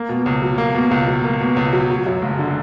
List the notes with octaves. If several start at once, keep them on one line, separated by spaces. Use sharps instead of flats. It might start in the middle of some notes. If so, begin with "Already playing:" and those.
Already playing: A#3
B2
C#2
F#3
A#3
B2
C#2
F#3
A#3
B2
C#2
F#3
F#3
F#2
F#1
D3